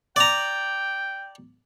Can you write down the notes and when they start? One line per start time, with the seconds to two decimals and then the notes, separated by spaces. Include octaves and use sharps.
0.16 D5 G5 A#5